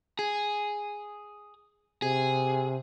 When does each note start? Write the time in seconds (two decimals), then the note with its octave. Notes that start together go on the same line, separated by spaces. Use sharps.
0.19 G#4
2.02 C3 G#4